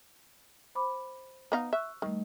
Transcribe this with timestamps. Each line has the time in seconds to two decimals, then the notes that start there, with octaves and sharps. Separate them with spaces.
0.75 C5 B5 D6
1.52 B3 D#4 F5
1.73 E5 C#6 E6 F#6
2.02 D#3 G3 A3